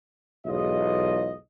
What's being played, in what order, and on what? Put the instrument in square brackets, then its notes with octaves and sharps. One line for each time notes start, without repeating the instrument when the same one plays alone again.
[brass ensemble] B1 E2 G#2 F4 D#5